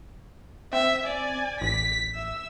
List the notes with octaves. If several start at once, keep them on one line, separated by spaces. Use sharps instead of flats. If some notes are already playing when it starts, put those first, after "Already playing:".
C4 E5
D5 G#5
A1 B6
E5 E6